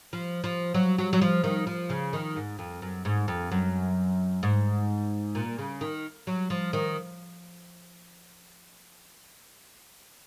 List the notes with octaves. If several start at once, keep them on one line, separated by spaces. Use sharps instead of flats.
F3
F3
F#3
F#3
F#3
F3
D#3
F3
C#3
D#3
G#2
F2
F#2
G#2
F2
F#2
G#2
A#2
C#3
D#3
F#3
F3
D#3